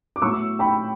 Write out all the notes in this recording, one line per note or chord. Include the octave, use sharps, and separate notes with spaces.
D6
A2 F#3 B3 E4 C#6 E6
G5 B5